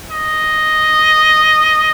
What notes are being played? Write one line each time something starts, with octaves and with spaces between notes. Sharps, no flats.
D#5